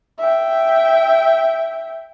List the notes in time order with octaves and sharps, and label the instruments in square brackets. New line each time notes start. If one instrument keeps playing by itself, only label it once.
[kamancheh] E5 G5